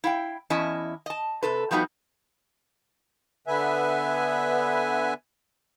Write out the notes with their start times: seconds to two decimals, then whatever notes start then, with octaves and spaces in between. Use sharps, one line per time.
0.04 E4 F5 G5
0.50 E2 C#4 E4 D#5 A5
1.06 D#5 A5
1.43 C3 A4 B4
1.71 F3 G3 B3 D#4 F#4
3.47 D3 B3 B4 E5 G#5